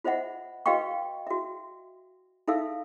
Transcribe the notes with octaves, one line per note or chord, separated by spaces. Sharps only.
F4 C5 D#5 E5 F#5
F#4 B4 D#5 F5 G5 C#6
F#4 E5
D#4 A4 E5 F5 E6